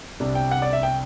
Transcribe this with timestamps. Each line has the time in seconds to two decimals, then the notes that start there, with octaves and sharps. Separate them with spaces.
0.20 C2 C3 G3 D4
0.35 G5
0.51 F#5
0.62 D5
0.73 E5
0.83 G5